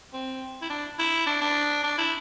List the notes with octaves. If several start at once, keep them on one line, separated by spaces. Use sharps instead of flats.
C4
E4
D4
E4
D4
D4
D4
E4